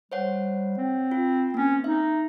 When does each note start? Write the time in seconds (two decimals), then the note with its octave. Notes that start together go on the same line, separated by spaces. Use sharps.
0.12 G3 C5 C#5 F#5
0.78 C4
1.12 F4
1.54 A#3 C4 C#4
1.84 D#4 E5